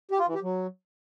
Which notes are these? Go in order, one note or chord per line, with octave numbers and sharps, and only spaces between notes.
G4
F4
E3
G4
F#3